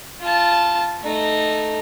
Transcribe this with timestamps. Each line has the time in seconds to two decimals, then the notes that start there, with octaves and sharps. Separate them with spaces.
0.20 F4 A5
1.01 A3 D#4